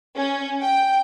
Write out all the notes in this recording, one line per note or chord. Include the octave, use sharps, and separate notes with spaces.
C#4
G5